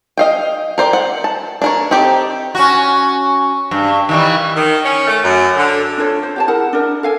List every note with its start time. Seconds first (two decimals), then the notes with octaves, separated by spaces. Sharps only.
0.17 D#5 F5 G5
0.78 A#4 C5 D5 G5
0.93 F#5
1.24 A5
1.62 D4 A#4 C#5
1.91 C4 D#4 G4 A4
2.55 C#4 F#4
3.71 G2
4.09 D#3 E3 G3
4.55 D#3
4.85 C#4
5.07 A3
5.23 F#2
5.57 D3
5.98 D4 F4 A4 C#5
6.23 C5
6.36 G4 G5 A5
6.48 E4 G#4 A#4 F#5
6.73 D4 A#4 E5
7.03 A4 F5 G#5